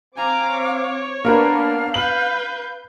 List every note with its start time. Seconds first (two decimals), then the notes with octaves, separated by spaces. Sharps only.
0.17 C4 F5 G#5 A#5 D6
0.51 C#5
1.25 A#3 B3 D4 A#4 B4 F5
1.94 B4 G6 F#7